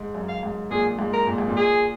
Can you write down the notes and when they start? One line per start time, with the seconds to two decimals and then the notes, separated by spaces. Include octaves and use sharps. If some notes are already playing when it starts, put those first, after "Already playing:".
Already playing: G#2
0.14 F#2
0.28 F5
0.43 G#2
0.71 A#2 G#4
0.99 G#2
1.13 A#4
1.27 A#2
1.38 G#2
1.48 A#2
1.56 G#4